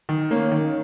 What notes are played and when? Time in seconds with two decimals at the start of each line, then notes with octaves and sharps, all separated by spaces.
0.09 D#3
0.31 A#3 C#4
0.52 D#3